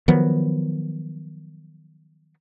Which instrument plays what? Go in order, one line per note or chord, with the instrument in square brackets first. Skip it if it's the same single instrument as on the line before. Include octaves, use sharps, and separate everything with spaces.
[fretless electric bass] D#3 F3 F#3 B3